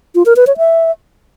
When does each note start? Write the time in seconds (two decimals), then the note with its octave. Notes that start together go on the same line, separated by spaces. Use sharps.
0.15 F4
0.26 A#4
0.36 B4
0.47 C#5
0.57 E5